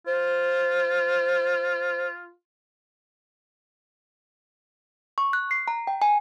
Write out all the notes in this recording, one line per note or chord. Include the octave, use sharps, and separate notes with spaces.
F4 C5
C#6
F#6
C7
A#5
G5
G#5